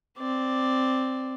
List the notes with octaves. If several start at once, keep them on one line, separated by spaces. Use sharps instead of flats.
C4 D5